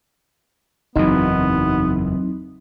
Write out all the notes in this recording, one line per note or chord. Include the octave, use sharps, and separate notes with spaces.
F#1 E2 E3 F#3 B3 C4 D#4